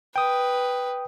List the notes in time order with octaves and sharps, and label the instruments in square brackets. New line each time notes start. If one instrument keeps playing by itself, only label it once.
[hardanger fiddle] B4 [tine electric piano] G5 D#6